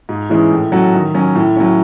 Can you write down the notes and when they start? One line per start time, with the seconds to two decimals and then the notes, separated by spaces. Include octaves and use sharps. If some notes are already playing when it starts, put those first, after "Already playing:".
0.09 G#2
0.30 E3 G#3 C#4
0.51 A2
0.72 F#3 C#4 F#4 A4
0.94 D#3
1.15 F#3 C#4
1.35 A2
1.57 F#3 C#4